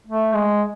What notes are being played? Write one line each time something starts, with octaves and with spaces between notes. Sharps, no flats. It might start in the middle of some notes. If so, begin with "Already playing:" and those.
A3
G#3